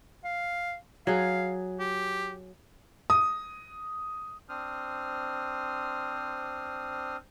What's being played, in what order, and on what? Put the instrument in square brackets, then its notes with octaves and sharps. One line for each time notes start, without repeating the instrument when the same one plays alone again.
[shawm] F5
[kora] F#3 G#4 [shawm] F5
[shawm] G4
[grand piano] D#6
[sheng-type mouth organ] C4 D4 C5 D#6 F6